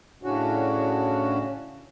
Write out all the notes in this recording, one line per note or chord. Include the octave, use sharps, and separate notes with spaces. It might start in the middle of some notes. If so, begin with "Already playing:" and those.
A2 C#3 C#4 D4 F#4